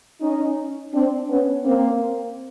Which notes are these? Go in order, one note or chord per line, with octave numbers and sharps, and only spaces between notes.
C#4 D#4
C4 D4
B3 C#4
A#3 C4